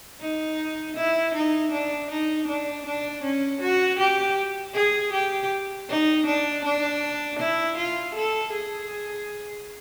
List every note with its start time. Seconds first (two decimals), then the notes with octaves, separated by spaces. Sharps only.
0.21 D#4
0.96 E4
1.34 D#4
1.71 D4
2.10 D#4
2.47 D4
2.86 D4
3.23 C#4
3.61 F#4
3.99 G4
4.74 G#4
5.13 G4
5.89 D#4
6.26 D4
6.64 D4
7.39 E4
7.77 F4
8.15 A4
8.52 G#4